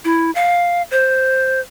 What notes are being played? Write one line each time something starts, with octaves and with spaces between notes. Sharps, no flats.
E4
F5
C5